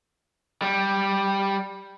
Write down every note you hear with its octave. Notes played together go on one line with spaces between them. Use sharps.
G3